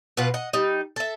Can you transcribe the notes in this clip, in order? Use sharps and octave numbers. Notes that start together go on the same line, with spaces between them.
B2 F4 B4 F#5
D#5 F#5
G3 D#4
A4 E5